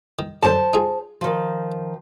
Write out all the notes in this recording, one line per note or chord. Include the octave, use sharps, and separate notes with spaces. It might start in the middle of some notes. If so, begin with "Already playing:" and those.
D#3
F#2 D3 C5 A5
D#4 F4 G#4
D#3 F3